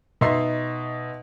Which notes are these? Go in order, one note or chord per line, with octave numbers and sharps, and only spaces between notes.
B2 D#4 E5 C6 C7